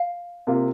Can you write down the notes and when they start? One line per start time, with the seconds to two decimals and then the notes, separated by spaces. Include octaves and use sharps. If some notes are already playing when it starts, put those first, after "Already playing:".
Already playing: F5
0.47 C3 A#3 F4